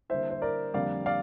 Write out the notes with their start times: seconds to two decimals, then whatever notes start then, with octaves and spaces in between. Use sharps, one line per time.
0.09 D3 G3 A#3 E4 C5 E5
0.30 C5
0.42 A#4 D5
0.74 F2 D3 G3 A#3 D5 F5
1.06 D5 F5